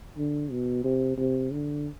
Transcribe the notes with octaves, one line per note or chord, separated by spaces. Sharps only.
D3
B2
C3
C3
D3